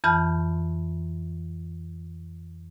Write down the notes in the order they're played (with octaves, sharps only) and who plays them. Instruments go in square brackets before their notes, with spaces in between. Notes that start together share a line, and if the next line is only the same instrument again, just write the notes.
[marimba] F2 E3 A5 B5 F6 G6